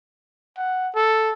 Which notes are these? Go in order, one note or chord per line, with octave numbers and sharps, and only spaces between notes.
F#5
A4